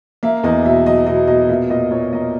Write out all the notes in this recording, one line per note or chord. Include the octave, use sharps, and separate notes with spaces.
A#3 E5
E2 D#5
B2 E5
F#3 D#5
B2 D#5
B2 D#5
A#2 E5
A#2 D#5
A#2 C#5
A#3 D#5